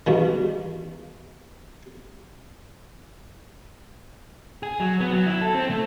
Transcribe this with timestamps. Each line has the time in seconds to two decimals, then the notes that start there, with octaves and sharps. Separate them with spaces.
0.07 E2 G2 B2 D#3
4.63 G#4
4.80 F#3
5.01 B3
5.13 F#3
5.26 E4
5.41 A4
5.54 C4
5.70 A3